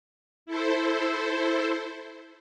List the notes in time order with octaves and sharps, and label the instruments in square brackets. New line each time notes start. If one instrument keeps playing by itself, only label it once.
[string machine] E4 A4 C5